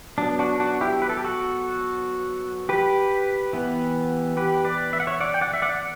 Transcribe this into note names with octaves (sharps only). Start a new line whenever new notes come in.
F#3 B3 D4
D4 F#4
D4 F#4
E4 G4
B4
A4
G4
F#4 A4
G4 B4
E3 B3
G4 B4
B4 D5
E5
F#5
C#5 E5
D5 F#5
G5
D5 F#5
E5
D5 F#5